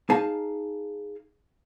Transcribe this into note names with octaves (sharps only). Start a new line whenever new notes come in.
D#4 G#4 F5 G#5 A5